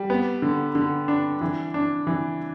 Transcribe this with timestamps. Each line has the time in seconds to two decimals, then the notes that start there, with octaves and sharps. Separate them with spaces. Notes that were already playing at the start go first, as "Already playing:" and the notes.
Already playing: G3
0.10 B3
0.42 D3
0.75 D3
1.08 D4
1.41 E3
1.74 D4
2.07 E3